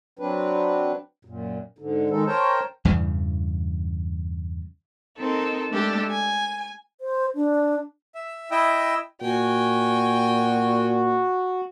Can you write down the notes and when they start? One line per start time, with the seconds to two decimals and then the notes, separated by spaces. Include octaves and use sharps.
0.19 F#3 C4 D4 B4
1.25 F#2 A#2
1.79 G#2 D3
2.10 D#3 G#3 D#4 A4
2.27 A#4 C5 C#5 G5 A5 A#5
2.85 E2 G2 C#3 E3
5.17 C4 D#4 A4 A#4
5.70 G#3 A3 D4 G4 A4
6.10 G#5
7.01 C5
7.35 D4
8.15 E5
8.51 E4 D#5 E5 G5
9.22 A#2 F#4 G5 G#5